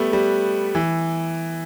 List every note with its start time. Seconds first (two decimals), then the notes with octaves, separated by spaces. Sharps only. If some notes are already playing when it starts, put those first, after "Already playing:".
Already playing: G3 A3 B3
0.13 G3
0.75 E3